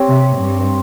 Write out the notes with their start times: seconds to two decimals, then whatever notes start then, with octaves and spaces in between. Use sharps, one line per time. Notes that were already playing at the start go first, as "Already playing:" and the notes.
Already playing: C4 G4 C#5
0.08 C3
0.38 G2